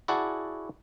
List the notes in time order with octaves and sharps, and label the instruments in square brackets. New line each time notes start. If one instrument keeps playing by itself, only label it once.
[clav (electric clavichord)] E4 F#4 G#4 D5 F#5 A5